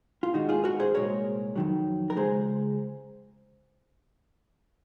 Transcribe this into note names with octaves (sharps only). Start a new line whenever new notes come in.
F4
G#2 D#3 G#3 D#4 F#4
F4 G#4
F#4 A#4
G#4 C5
C2 A#2 G#3 A#4 C#5
F2 D#3 F#3
A#4
C#2 C#3 G#3 G#4 C5